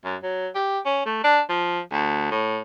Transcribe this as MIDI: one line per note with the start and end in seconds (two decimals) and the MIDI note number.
0.04 0.16 42
0.23 0.48 54
0.55 0.79 67
0.85 1.02 61
1.06 1.23 57
1.24 1.40 62
1.49 1.80 53
1.92 2.30 38
2.31 2.61 45